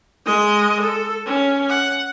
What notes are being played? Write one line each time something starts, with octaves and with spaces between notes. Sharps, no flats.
G#3 D#5
A4
C#4
F#5